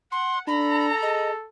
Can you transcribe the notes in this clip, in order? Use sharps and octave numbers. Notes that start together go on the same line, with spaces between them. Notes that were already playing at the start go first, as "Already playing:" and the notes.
F#5 C6
D4 A4 A#5 B5
G#4 D#5